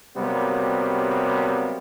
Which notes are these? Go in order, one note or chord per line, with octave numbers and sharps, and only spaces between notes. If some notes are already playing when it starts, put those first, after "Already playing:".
C3 F#3 G3 A#3 B3